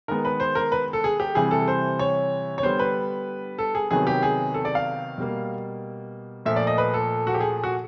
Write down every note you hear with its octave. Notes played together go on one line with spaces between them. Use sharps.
D#3 G#3 B3 A#4
B4
C5
A#4
B4
A4
G#4
G4
C3 E3 G3 G#4
A4
C5
C#5
C#5
D3 G3 B3 C5
B4
A4
G#4
C3 D#3 F#3 B3 G#4
G4
G#4
A4
D5
F5
B2 G3 A#3
A#2 F3 A3 E5
D5
D#5
B4
A4
F#4
G4
G#4
F#4